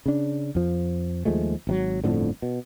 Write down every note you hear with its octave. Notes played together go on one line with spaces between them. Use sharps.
C#3 D4
F2 F3
D#2 F3 G#3 A3
G#1 C3 F#3
G1 F2 A2 D3
B2